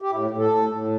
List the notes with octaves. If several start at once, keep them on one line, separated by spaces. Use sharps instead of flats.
G4
A2 E4
A2
A4
A2
A2